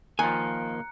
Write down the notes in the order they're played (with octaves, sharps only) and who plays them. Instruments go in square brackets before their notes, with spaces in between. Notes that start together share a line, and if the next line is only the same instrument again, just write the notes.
[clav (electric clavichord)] D#3 F3 [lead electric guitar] A#3 [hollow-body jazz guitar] G#5 [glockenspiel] A#5 F#6 C#7